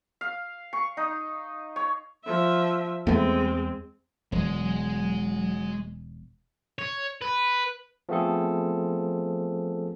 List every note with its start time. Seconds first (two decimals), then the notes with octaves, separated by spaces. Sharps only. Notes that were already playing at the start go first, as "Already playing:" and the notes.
0.21 F5
0.73 C#6
0.97 D#4
1.76 C#5
2.25 F3 E5
3.07 E2 G#3 A3 B3 C4
4.32 E1 F#3 G#3
6.79 C#5
7.22 B4
8.09 F3 A3 B3 C4 G#4 A4